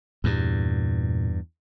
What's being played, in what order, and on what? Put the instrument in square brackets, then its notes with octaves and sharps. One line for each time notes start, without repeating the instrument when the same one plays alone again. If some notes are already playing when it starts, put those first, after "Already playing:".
[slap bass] E2 G2 [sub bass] A#2